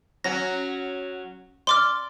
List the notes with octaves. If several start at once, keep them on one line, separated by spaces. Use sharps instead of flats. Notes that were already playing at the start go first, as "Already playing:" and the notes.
F#3 C#4 F#4 A#6
D5 C6 D6 F6